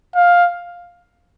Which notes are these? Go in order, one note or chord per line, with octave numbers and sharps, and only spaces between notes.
F5